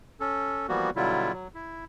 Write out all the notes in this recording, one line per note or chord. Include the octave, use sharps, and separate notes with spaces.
C#4 A4
E3 F3 G3 A#3 B3 F#4
B2 D3 F#3 G3 E4 F4
F#3
E4